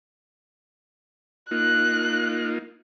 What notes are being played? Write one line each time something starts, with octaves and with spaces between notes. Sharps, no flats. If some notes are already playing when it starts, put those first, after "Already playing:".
A#3 D#4 F4 F#6